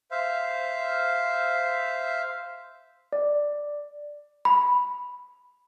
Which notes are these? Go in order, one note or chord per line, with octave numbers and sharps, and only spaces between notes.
C5 E5 F5
D5
B5